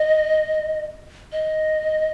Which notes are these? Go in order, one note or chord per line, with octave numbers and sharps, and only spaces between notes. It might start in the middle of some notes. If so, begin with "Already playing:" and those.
Already playing: D#5
D#5